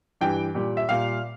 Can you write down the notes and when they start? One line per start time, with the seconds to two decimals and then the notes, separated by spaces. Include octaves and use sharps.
0.21 G2 E3 G3 G5
0.55 A#2 G3
0.77 E5
0.89 A#2 G3 F5